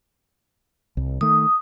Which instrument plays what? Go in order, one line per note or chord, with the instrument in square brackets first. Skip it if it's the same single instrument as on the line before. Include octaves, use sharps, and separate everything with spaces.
[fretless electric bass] C2
[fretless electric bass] D#3 A3 [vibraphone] D#6